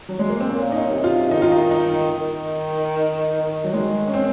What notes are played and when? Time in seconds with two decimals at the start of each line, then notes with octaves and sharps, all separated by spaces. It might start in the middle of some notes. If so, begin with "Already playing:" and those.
0.09 F#3
0.19 G#3
0.30 A#3
0.40 C4
0.49 A#2 C#4
0.72 D#4
0.77 C#4
0.90 C3
1.04 F4
1.31 D#3 D#4
1.42 F4
1.52 D#4
1.71 D#4
2.12 D#3
3.64 F#3
3.73 D#3 G#3
4.08 C#4
4.14 C4